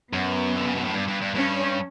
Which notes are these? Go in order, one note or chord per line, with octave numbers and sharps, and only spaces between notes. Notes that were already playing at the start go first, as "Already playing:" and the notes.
F#2 B3
D3
C#3
B2
A2
G2
G2
G2
G2 C#4